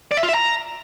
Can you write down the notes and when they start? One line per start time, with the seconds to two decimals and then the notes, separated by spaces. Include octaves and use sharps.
0.11 D5
0.17 E5
0.23 F4
0.29 E5
0.34 A#5